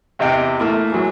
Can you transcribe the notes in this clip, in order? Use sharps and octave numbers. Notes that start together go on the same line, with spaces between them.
E2 C3 D#5 F5 G5
A3 A#3 E4
E3 F#3 G#3